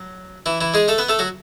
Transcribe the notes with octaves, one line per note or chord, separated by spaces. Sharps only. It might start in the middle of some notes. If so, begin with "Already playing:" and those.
Already playing: F#3
E3 E4
E3 E4
G#3 G#4
A3 A4
B3 B4
A3 A4
F#3 F#4